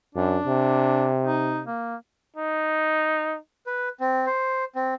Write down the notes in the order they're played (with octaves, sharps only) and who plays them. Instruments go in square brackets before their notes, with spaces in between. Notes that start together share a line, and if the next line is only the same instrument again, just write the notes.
[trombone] F#2 [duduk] D4
[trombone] C3
[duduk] D#4
A#3
[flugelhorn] D#4
[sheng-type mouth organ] B4
C4
C5
C4